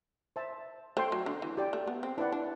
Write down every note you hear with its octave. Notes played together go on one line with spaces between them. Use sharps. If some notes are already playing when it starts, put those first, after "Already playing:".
C5 E5 A5
A3 C5 G5 C6
F#3
D3
E3
G4 D5 G5
A3
B3
C4
D4 E4 B4 D5 F#5
D4